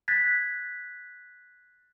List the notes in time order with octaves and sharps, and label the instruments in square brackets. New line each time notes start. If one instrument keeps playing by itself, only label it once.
[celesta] F#6 G#6 A6 B6